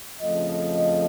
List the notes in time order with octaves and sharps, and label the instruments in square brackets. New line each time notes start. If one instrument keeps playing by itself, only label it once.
[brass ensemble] F2 C#3 F3 A3 D#5